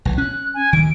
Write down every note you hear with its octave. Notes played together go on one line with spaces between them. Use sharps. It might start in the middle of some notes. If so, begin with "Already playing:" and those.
B1 E3
C#4 F#6
G#5
D2 D#3 D7